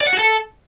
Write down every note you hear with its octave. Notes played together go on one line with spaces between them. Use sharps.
D5
F#5
F#4
A4